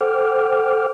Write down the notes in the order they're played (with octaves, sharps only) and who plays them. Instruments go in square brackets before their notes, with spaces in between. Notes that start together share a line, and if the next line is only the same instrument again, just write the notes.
[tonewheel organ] A4 C5 F#5 G5 D6 F6